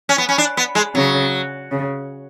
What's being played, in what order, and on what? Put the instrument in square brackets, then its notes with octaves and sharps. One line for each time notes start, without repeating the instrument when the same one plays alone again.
[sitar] C#4
B3
C#4
D4
B3
G#3
[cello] C#3 [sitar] F#3
[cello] C#3